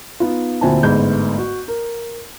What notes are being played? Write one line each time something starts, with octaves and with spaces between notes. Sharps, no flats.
B3 D#4 F4
D2 A#2 C4 E4 G#5 A5
G1 G#2 A3 G#4 B5 G6
F#4
A#4